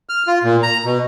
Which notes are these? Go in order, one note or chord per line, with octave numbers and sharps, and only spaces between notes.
F6
F4
A#2
A#5
B2